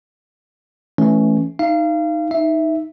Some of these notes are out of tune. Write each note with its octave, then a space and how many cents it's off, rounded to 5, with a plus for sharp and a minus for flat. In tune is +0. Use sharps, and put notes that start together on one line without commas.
E3 +0 A3 -20 C#4 +0
D#4 +0 F5 -30
D#4 +10 E5 +0